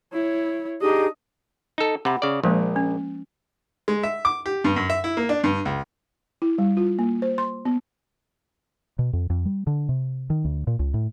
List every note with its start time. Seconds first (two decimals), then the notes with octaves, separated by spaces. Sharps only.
0.13 E4 C#5
0.81 D4 D#4 G4 G#4 D#5
1.78 D#4 A4
2.05 C3 F#5 B5
2.22 C#3 D5
2.44 A#1 F3 G#3 A#3
2.76 C#4
3.88 G#3
4.03 E5
4.25 D6
4.46 G4
4.64 G2
4.76 F#2
4.90 E5
5.04 E4
5.17 A#3
5.29 D4
5.44 G2
5.65 C#2
6.42 E4
6.58 G3
6.77 F4
6.99 A#3
7.22 C5
7.38 C6
7.65 B3
8.99 B2
9.13 F2
9.30 F2
9.45 G3
9.67 D3
9.89 C3
10.30 D#3
10.45 D2
10.67 A#2
10.79 C#2
10.94 A2